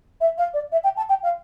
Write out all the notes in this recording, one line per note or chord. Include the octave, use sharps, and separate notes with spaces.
E5
F5
D5
E5
G5
A5
G5
F5